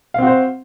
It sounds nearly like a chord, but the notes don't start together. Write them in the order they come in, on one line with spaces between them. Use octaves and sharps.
F5 C4 F#4 C5